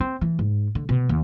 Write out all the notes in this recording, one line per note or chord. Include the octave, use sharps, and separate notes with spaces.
C4
E3
G#2
D3
B2
D#2